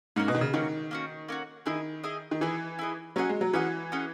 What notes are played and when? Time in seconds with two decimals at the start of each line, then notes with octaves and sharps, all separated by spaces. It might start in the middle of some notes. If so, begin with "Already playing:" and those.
0.16 G#2 A#3 C#4 F#4
0.28 B2
0.35 D#3
0.41 C#3
0.53 D#3 A#3 C#4 F#4
0.91 A#3 C#4 F#4
1.28 A#3 C#4 F#4
1.66 D#3 E4 G#4 D#5
2.04 E4 G#4 D#5
2.31 D#3
2.41 E3 E4 G#4 D#5
2.79 E4 G#4 D#5
3.16 F#3 C#4 G#4 D#5 F#5
3.29 G#3
3.41 F#3
3.53 E3 C#4 G#4 D#5 F#5
3.92 C#4 G#4 D#5 F#5